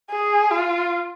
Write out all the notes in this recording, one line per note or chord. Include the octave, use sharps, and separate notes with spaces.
G#4
F4